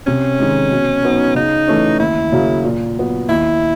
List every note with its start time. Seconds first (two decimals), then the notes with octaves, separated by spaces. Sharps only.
0.07 C3 C#4
0.39 D#3 G#3
0.71 B2
1.03 F#3 B3 D#4
1.35 C#3 D#4
1.68 E3 A3 C#4
2.00 D#2 E4
2.32 C#3 F#3 A#3
2.64 A#2
2.97 F#3 B3
3.29 D#2 E4